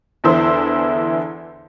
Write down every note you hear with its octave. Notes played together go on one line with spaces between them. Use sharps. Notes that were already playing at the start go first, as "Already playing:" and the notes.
E2 D3 E3 E4 C5 E6